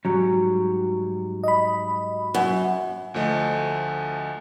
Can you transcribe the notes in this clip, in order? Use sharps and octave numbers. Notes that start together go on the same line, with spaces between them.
G#2 F#3 G3 C#4
D#5 B5
F#2
D2 F3 A3 D#5